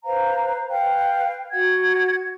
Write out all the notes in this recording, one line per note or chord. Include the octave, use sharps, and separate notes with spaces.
B4 C5 F5 A#5
B4 F5 G5
F#4 F#5 G#6